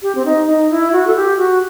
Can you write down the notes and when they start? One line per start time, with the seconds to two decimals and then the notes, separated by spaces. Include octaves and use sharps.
0.02 G4
0.15 C4
0.25 D#4
0.47 D#4
0.70 E4
0.92 F#4
1.07 A4
1.16 G4
1.38 F#4